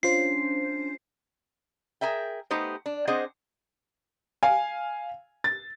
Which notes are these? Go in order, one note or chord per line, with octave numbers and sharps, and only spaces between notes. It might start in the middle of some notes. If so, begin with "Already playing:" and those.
C#4 D4 F4 C5 C7
G#4 A#4 E5 G5
A3 B3 D#4 G4 C5
D4
C4 D4 G#4 C5 D#5 F#5
F5 G#5
A6